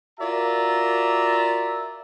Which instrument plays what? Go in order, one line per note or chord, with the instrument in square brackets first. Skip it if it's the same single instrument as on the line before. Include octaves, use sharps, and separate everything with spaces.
[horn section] F4 F#4 A#4 D5 E5 A#5